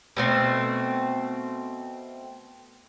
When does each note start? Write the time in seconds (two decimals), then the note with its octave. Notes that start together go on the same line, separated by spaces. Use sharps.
0.17 B2 A3 C4